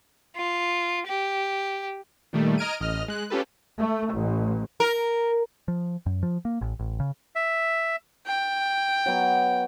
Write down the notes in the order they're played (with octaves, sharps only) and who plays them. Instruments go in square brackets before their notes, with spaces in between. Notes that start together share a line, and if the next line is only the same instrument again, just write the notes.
[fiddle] F4
G4
[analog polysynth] A#2 D#3 G3 A3
D#5 A#5 F6 G#6 D7 D#7
A1 D#5 F6
G#3 F#6
C#4 F4 G4 A4 B4
[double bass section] A3
A1
[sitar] A#4
[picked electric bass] F3
F#2
F3
A#3
A1
A1
C#3
[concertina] E5
[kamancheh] G5
[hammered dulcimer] F#3 B3